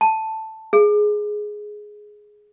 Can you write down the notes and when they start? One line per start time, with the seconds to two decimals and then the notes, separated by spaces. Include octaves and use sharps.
0.01 A5
0.73 G#4